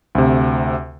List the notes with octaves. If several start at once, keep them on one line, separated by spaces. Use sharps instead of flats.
D2 C3